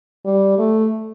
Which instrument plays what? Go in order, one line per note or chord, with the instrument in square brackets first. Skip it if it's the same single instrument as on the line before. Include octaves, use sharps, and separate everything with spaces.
[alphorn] G3
A3